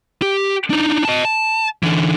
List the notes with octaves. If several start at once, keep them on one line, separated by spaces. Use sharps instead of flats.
G4
D4 D#4
D#5 A5
A5
D3 E3